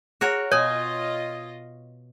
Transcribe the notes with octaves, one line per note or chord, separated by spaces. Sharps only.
F#4 G#4 A#4 C#5 F#5
B2 F4 C#5 D#5 G#5 D#6 G#6